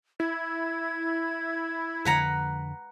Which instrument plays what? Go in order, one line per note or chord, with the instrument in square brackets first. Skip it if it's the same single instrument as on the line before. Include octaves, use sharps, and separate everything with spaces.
[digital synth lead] E4 [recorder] G#6
[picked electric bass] F2 D3 [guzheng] B4 F#5 A#5